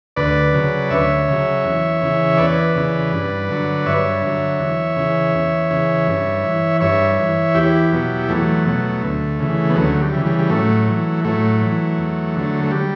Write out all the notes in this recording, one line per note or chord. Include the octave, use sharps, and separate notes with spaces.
D2 B4 D5
C#3 F#3
D2 C#5 E5
C#3 F#3
E2
C#3 E3
E2 B4 D5
C#3 E3
G2
D3 F#3
G2 C#5 E5
D3 F#3
E2
C#3 E3
E2
C#3 E3
G2
E3
G2 C#5 E5
E3
E2 E4 G4
B2 F#3
E2 F#3 A3
B2 F#3
D2
C#3 E3
B3
D2 F#3 A3
G3
C#3 E3
G3
G3
A2 F#3 A3
E3
A2 F#3 A3
E3
E2
D3 F#3
A3
G3